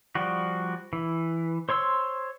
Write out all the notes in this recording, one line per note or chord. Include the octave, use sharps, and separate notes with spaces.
F3 G3 F#4
E3
C5 C#5 C6 E6